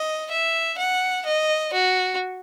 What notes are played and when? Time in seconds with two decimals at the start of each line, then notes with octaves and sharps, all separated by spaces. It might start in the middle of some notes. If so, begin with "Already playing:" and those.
Already playing: D#5
0.31 E5
0.78 F#5
1.26 D#5
1.73 F#4